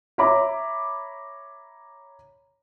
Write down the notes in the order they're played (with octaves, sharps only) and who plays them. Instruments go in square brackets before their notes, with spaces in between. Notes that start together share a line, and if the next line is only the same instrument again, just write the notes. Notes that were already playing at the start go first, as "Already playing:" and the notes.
[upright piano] C#5 E5 A#5 B5 D6